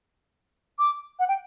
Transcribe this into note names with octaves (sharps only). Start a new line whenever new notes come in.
D6
F#5
G5